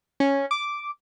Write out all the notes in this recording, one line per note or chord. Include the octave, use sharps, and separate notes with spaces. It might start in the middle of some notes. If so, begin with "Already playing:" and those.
C#4
D6